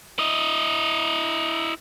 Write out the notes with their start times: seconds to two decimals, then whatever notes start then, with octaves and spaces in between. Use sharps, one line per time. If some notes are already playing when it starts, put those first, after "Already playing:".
0.19 E4 D#5